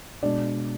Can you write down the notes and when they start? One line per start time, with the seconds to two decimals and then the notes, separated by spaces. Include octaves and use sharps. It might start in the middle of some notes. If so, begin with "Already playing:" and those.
0.22 B2 G#3 D4 D5